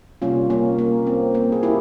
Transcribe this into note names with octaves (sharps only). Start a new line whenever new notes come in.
C3 G3 A#3 C#4 F4
A#3 C#4
A#3
C4
A#3
G#4
E4 G4